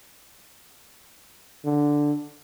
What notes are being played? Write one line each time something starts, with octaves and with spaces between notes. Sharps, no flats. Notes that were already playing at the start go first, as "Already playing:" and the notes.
D3